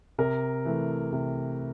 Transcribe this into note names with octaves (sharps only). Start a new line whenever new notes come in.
C3 A#4
E3 A3
C3